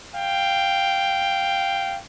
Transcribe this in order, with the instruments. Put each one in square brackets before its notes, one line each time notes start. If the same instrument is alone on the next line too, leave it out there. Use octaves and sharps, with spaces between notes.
[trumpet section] F5 G5